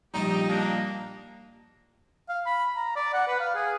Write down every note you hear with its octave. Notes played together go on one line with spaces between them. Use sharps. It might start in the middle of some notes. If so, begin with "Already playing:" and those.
A#1 G3 D#4 G4 D#5 G5 A5
A#3 D4
F5
B5
A#5
D5
F#5
B4
F5
G#4